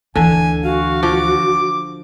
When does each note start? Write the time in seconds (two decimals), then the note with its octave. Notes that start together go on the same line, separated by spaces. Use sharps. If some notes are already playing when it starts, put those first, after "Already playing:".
0.15 D2 D3 E3 G#5
0.64 F#4 F5
1.03 F3 D6